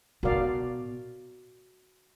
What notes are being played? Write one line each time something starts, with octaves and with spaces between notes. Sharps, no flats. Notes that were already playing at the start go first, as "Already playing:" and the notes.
B2 F#4 A#4 D5 F5